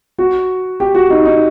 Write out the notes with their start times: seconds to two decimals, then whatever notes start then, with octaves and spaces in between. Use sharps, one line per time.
0.18 F#4
0.80 G4
0.95 F#4
1.10 D#4
1.26 D#4